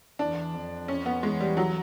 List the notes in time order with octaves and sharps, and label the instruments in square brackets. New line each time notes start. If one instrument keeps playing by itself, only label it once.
[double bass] E2 [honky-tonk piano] D4
[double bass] F2
[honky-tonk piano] C#4
B3
[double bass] E2 [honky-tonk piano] G#3
[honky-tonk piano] G3
F#3